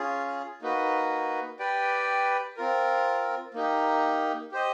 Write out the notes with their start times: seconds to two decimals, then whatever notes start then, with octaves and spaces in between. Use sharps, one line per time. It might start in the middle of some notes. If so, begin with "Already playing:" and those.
Already playing: C#4 F4 G#4
0.62 A#3 D#4 F#4 B4
1.59 G4 B4 D5 G5
2.57 C4 F4 A#4
3.54 A#3 D#4 G4
4.52 G4 C5 D#5